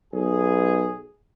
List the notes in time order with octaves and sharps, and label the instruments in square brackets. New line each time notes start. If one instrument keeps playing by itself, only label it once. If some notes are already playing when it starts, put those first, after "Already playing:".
[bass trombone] B1 [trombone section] G#4